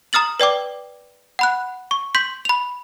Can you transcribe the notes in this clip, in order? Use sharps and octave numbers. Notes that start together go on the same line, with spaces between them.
A#5 D#6 F6 A6 F#7
B4 D5 G5 D6
F#5 B5 F#6
C#6
C6 G6 B6
B5 F7